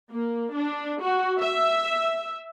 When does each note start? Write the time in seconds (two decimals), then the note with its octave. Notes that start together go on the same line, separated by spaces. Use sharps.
0.11 A#3
0.55 D4
1.03 F#4
1.40 E5